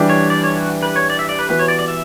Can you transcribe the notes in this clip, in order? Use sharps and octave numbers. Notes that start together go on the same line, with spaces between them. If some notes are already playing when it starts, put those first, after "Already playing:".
Already playing: E3 G3 D4 G4
C#5
D5
C#5
F#4
B4
C#5
D5
E5
D5
B4
E3 B3 F#4 B4
C#5
D5
D5
E5